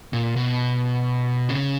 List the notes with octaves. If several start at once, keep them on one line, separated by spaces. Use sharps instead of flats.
A#2
B2
C#3